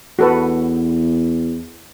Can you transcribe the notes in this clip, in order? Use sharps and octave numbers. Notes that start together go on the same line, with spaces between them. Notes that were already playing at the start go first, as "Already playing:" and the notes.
E2 F#4 A4 B4